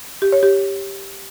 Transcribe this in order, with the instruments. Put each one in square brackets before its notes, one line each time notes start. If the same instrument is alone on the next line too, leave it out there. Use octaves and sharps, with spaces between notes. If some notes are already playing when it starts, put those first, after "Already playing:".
[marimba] G4
C#5
G4